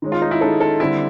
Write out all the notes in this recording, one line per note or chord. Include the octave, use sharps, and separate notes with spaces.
D#3 G#3 C#4
F4
D#4
E4
D#3 G#3 C#4 A4
A4
D3 G3 C4 E4